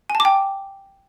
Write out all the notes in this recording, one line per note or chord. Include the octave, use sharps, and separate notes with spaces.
G#5
A5
D6
G5